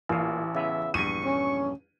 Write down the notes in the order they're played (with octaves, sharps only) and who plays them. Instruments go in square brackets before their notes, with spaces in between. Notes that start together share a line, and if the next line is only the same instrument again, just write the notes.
[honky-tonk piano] A1 [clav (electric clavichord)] A#2 F5
[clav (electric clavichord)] C#3 B3 [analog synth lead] E5
[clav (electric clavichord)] A#1 E2 G2 [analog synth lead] C#6 [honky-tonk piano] D#7
[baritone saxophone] C#4